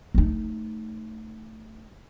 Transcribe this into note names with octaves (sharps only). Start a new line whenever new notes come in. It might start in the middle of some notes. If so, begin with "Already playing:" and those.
A3 D#4